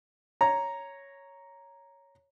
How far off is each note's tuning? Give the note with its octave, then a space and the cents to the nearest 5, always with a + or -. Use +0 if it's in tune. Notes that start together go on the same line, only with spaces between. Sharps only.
C#5 +0 A#5 +0